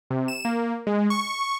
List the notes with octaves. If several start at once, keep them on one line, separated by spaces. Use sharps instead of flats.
C3
E7
A#3
G#3
C#6